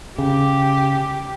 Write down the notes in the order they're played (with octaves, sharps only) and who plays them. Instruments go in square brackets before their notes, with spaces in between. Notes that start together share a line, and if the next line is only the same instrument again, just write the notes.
[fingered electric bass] C#3 [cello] G4